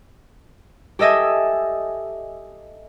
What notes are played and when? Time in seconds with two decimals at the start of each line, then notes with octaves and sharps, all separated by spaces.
0.99 G4 A4 D#5 E5 G#5